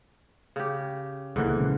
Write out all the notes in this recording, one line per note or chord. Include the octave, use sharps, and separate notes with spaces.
C#3 G4
D#1 C#2 G#2 D3 E3 A#3
A#1 C#3 A#3